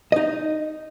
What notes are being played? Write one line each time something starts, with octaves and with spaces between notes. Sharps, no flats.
D#4 D#5